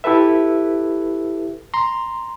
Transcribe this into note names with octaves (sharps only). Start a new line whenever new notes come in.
E4 G4 A4 B4 E5
A#5 C6